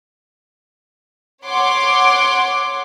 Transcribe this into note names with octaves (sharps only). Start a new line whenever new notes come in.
C#5 F#5 C6 D6